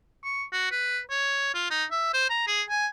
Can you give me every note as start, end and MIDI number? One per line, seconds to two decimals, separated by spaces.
0.24 0.44 85
0.53 0.68 66
0.71 1.00 71
1.11 1.51 73
1.54 1.68 65
1.71 1.85 63
1.91 2.09 76
2.14 2.30 72
2.30 2.44 82
2.47 2.63 68
2.70 2.87 80